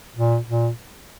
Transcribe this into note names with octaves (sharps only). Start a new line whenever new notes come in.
A#2
A#2